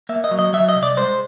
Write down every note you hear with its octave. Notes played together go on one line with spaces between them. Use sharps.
A#3 E5
D#5
F#3
D#5
F#3 E5
D#5
C2
D5
G#3 C5